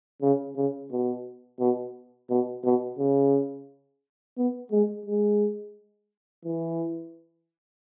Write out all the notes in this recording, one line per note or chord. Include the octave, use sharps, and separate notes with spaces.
C#3
C#3
B2
B2
B2
B2
C#3
B3
G#3
G#3
E3